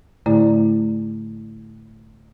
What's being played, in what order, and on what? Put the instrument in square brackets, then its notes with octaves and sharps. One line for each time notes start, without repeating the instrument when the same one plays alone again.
[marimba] A2 D3 A3 E4 D5 A#5